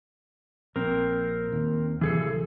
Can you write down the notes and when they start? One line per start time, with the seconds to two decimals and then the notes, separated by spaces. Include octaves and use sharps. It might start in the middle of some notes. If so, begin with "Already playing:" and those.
0.76 A#1 C4 A#4
1.52 D#2
2.01 D1 C3 E3 G#4 A4